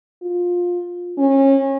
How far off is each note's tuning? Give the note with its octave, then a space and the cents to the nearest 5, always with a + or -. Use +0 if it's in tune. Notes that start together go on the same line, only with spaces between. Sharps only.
F4 +20
C#4 -30